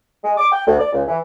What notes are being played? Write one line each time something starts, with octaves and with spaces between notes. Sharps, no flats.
G#3
D6
G5
D2
D5
C#2
E3